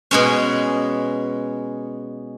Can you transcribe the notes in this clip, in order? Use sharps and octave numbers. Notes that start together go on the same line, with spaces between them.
B2 G#3 C#4